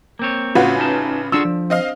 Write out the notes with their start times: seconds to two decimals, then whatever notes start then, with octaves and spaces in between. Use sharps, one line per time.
0.19 A#3 C4 C#5
0.55 A1 C#3 F4 F#4 B4 F#5
0.76 C#4 D#4 A5
1.32 D4 F4 F#4 G#4 E6
1.45 F3
1.70 C4 D#5 F5